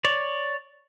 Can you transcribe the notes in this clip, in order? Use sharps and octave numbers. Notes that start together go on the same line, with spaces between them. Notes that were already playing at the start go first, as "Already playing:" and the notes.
C#5 D5